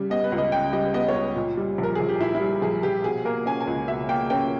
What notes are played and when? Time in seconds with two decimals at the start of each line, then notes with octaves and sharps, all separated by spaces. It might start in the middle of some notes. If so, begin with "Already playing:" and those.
Already playing: C#3 G3
0.10 B3 D#5
0.24 B4
0.32 C#2
0.38 D#5
0.52 C#3 G5
0.73 G3 D#5
0.94 B3 D#5
1.08 C#5
1.15 C#2
1.36 A#2
1.57 G3
1.78 A#1
1.83 A#4
1.95 A#1 G#4
2.09 G4
2.20 A#2 E4
2.35 E4
2.41 G3
2.62 A#1 G#4
2.83 A#1 G4
3.04 B2 G#4
3.25 A#3 A#4
3.46 C#4 G#5
3.60 G#5
3.67 C#2
3.88 B2 E5
4.09 A#3 G5
4.30 C#4 G5